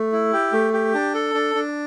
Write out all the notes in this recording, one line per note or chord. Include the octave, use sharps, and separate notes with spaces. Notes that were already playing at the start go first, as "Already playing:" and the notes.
Already playing: A3
E4
G4
A3
G4
D4
A4
D4
D4